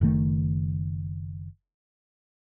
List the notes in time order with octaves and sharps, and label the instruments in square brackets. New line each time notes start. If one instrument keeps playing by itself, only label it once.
[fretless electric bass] F#1 D#3 A3